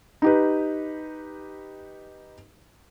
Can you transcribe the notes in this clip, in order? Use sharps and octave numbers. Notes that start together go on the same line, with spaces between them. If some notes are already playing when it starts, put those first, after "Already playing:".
D#4 G4 B4